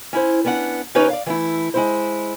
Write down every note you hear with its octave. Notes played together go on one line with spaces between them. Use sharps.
C#4 E4 C5
B3 C#4 D4 F#5
D#2 C#4 D#4 G4 B4 C#5
D5 F5
E3 A3 E4
G#3 E4 C5